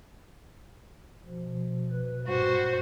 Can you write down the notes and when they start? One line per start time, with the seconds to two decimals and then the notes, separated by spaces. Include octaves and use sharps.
1.26 B2 F3
1.91 B2 B4
2.24 G2 A#2 G3 F#4 C5